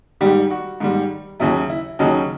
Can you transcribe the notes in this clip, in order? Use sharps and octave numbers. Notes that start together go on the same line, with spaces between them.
G#2 D#3 G3 G4
F#4
G#2 D#3 G3
D#2 C#3 F#3 E4
E4
D#2 C#3 F#3 D#4